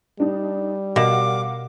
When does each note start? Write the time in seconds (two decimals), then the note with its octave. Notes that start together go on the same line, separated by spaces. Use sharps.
0.20 G3 D4 D#4
0.96 B2 A#4 F5 F#5 D6